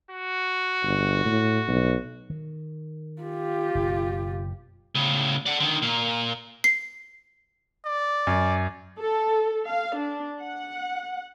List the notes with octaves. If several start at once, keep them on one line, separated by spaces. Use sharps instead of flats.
F#4
G1
A2
B1
D#3
F4 G4
F#1 B2
A2 C#3
D5 F#5
D3 D#3
A#2 A#3
C7
D5
F#2
A4
F5
D4
F#5